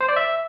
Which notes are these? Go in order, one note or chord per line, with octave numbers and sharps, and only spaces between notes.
C5
D5
E5